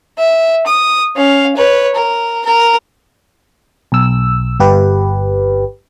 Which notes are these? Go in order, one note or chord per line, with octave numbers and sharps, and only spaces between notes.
E5
D#6
C#4 F5
B4 C#5
A#4
A#4
B1 E6
G1 G4 B4